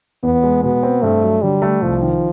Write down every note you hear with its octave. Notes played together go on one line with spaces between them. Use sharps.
E2 B3
G#3
B2 B3
C4
G2 A3
F#3
D3 G3
A3
C2 F3
D#3